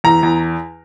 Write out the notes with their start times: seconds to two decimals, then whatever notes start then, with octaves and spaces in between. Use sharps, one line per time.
0.04 E2 A#5
0.23 E2